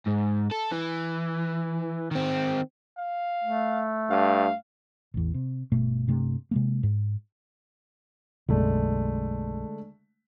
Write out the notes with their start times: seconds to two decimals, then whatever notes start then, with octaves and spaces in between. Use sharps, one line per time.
0.06 G#2
0.51 A4
0.72 E3
2.11 D#3 C4
2.97 F5
3.44 A3
4.10 G2 F5
5.14 A1 E2
5.34 C3
5.72 G1 B2 A3
6.08 G2 C3 A3
6.51 C3 G#3 A#3
6.83 G#2
8.48 B1 F#2 D3 G#3 A3